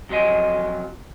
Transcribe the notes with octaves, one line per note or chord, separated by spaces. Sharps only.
F2 F#3 F4 D#5 G#5